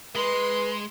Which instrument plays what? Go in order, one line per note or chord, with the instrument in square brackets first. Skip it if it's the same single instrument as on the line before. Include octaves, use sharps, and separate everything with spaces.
[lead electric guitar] G#3 [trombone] B4 [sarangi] C6